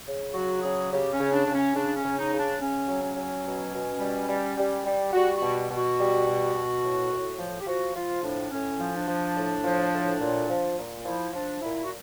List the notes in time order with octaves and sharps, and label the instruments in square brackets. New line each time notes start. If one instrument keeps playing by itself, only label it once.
[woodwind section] C#3
F#3 F#4
C#3 G#4
C#3 G4
C#4
C#3
D4
C#3
C#4
C#3 D4
C#4
C#3
D#4
C#3
D4
C#3 C#4
F#3
C#4
F#3
B2
B2
G3
G3
G3
G3
G3 F#4
F#4
B2
B2
F#4
G3
B2
B2
A2
A2
F3
G4
F3 F#4
F3 F4
A2 D4
A2 C#4
F3
D4
F3
A2
F3
A2
A#2
F3
A#2
F3 E4
F3 D4
A#2 E4
F#4